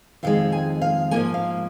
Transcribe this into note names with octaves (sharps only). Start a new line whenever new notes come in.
F2 D#3 G#3 F5
G#5
F5
G#2 F3 A#3 G#5
F5